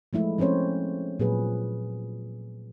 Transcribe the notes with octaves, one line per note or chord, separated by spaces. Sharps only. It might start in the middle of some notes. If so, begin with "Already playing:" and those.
F3 G#3 A3 E4
F3 C4 C#4 C5 C#5
A#2 F#3 G#4 B4